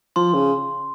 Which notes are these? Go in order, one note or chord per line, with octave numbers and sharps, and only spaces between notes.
F3 C6
C#3